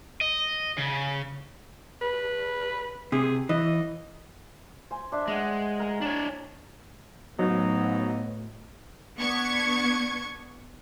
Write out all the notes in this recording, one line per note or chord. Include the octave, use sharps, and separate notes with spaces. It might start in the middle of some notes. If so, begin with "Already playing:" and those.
D#5
C#3
B4
C3 G#4
E3 D#5
C5 G#5
D4 C5 E5
G#3 D#5 F#5
A#4 A#5
D4 C#5
A2 F#3 B3 D#4
B3 D4 C#6 G#6